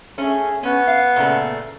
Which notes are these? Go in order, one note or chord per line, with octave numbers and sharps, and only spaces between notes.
A3 C#4 G#4
B3 C#4
F5
A#2 C#3 A3